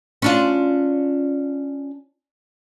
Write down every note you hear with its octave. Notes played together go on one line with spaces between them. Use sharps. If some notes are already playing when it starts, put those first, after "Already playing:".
C#4 D4 F4